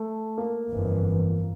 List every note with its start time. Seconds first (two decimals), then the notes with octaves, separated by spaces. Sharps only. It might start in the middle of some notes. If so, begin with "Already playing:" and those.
Already playing: A3
0.38 A#3
0.68 G1 F2 E3